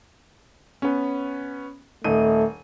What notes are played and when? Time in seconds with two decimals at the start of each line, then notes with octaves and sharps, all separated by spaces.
0.82 B3 C#4
2.04 D#1 A3 D#4 D#7